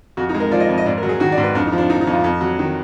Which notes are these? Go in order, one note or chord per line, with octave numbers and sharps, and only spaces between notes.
F2 F#4
D#4
G#3
A#4
F3 D5
D#5
F2
D#5
G#2 D5
A#4
F#3
G#4
D#3 F#4
D5
G#2
B4
F2 D4
D#4
F3
D4
D3 D#4
D#4
F2
F4
F2
F#3
D#3